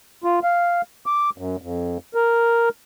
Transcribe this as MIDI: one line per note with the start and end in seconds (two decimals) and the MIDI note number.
0.24 0.40 65
0.43 0.81 77
1.06 1.30 86
1.38 1.56 42
1.62 1.98 41
2.14 2.69 70